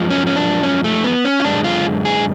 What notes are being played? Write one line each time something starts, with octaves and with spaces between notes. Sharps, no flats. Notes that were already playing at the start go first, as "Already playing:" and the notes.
Already playing: F#2 F3 G#3
C#4
C#4
D4
C#4
A3
B3
C#4
F4
F#2 D3 G#3 D4
F4
G#4